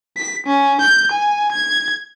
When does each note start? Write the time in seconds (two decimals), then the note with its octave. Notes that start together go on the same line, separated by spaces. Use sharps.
0.17 B6
0.46 C#4
0.81 G6
1.11 G#5
1.52 G#6